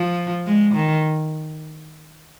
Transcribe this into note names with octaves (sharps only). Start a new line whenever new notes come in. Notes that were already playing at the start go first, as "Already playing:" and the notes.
Already playing: F3
G#3
D#3